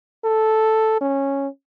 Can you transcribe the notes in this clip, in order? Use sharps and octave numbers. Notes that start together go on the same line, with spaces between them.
A4
C#4